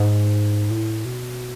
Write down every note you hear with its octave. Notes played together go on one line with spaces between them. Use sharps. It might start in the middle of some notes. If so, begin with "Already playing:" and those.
Already playing: G#2
A2
B2